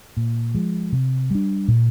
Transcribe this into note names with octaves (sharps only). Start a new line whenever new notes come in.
A#2
F3 G#3
C3
G3 D4
A#2